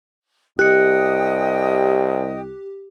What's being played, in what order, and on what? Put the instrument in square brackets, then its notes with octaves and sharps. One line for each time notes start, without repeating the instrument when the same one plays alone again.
[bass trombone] C2 [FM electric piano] G4 [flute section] D#5 G5 D#6 [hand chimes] F#6 C#7